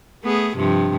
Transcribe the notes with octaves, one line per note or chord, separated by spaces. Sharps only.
A3 B3 G#4
G2 C3 F3